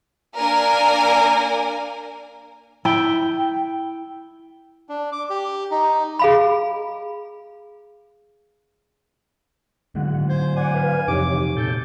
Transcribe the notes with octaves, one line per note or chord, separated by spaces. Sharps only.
A#3 D4 A#4 G#5
E4 G5
D4
D6
G4
D#4
G#4 F5 B5
G#2 D3 D#3 F#3 G#3 F#5
C5 G#5
D5 F#5 G#5
B4 F5
F2 C3 E3 D#4 G4 C#5 D6
A#2 C#3 A4 G6